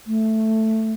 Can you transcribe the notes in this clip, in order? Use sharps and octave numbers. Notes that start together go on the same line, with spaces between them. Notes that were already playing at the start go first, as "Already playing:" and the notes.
A3